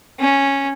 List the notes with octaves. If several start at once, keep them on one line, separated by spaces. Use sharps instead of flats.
C#4